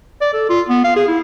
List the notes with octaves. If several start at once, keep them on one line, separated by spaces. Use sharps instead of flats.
D5
A4
F4
B3
F5
G#4
E4